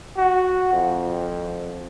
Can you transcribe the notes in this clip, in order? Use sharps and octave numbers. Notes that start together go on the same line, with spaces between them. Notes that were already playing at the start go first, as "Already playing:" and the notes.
F#4
F2